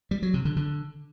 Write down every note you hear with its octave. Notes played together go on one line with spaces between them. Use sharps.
G3
F#3
C3
D3
D3